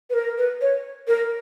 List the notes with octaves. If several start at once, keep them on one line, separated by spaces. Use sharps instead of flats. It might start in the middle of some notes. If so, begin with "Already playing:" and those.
B4
A#4
B4
C#5
A#4